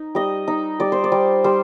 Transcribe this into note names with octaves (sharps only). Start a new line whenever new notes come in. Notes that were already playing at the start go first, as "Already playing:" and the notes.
Already playing: D#4
G3 D#5
D#4
G3 D5
C5
D5
G3
G3 C5